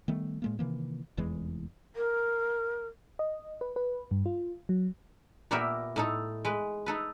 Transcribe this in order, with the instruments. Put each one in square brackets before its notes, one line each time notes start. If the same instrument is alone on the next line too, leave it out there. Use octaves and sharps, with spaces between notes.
[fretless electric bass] D#3 G3 A3 B3
A2 G#3 A#3
C3 D#3 E3 A#3
F1 E2 E3 G#3
[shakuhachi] A#4
[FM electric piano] D#5
B4
B4
G2
F4
F#3
[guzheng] A#2 A#3 B3 G4 A#4 E5
A2 D#4 A4
G#3 B4
D#4 A4 B4